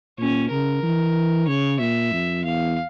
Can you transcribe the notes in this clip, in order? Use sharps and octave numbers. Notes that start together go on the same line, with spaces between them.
A#2 C#4
C#3 A#4
E3
C#3 C#5
A#2 E5
F2
E2 F5